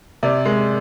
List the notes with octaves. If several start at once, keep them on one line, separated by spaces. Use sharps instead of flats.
C3 D5
G#3